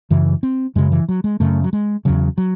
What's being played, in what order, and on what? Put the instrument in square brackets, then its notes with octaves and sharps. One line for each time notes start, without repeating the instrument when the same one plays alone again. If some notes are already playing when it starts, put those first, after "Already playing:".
[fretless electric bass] F#2 C#3 E3
C4
F#2 C#3 G#3
E3
F#3
G#3
F#2 C#3 A3
F#3
G#3
E2 C#3 F#3
F#3